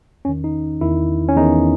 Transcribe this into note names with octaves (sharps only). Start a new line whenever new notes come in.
E2 D#3 C#4
D#4
E2 D#3 E4
C#4
E2 D#3 D#4